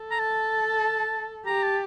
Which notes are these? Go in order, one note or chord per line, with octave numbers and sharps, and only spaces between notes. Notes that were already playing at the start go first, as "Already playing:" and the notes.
Already playing: A4
A#5
A5
G4 A#5
A5